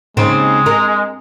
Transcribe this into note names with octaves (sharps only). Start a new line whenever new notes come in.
D#2 C#3 G#3 C4
A#4